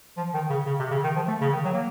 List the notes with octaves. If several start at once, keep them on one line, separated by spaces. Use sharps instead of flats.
F3
D#3
C#3
C#3
C3
C#3
D#3
F3
A3
C#3
D#3
F#3
A#3